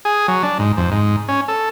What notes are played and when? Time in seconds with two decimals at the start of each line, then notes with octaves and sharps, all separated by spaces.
0.05 G#4
0.28 F#3
0.43 D4
0.59 G#2
0.77 F2
0.92 G#2
1.28 C#4
1.48 A4